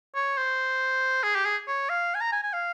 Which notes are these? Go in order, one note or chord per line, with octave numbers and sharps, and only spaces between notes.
C#5
C5
G#4
G4
G#4
C#5
F5
G#5
A#5
G#5
G#5
F5